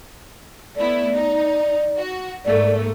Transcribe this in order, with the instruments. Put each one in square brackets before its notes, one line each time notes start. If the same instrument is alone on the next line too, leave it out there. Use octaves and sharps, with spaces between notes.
[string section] A3 B3 E4 [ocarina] D5
[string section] D#4
F#4
[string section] G#2 A3 A#3 [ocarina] D5